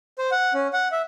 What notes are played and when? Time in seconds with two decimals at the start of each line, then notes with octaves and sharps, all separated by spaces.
0.19 C5
0.32 F#5
0.54 C#4
0.73 F#5
0.92 E5